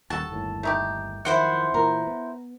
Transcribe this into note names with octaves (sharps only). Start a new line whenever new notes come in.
D#1 D#2 F#4 A4 A5
G1 D#2 A2
A3 D#4 G4
F2 D#3 F#3 E4 C5 F#5
A#2 E3 A#4
B3